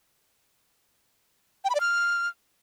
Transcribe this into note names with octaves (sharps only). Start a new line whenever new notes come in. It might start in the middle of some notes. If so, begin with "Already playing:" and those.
G5
B5
D5
F6